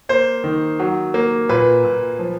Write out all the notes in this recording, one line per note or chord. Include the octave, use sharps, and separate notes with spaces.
A#3 C5
D#3
F#3
A#3
A#2 B4
A#2
F3